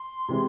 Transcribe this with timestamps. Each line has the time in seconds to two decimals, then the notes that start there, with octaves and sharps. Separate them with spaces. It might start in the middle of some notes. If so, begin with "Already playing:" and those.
Already playing: C6
0.28 C3 E3 G#3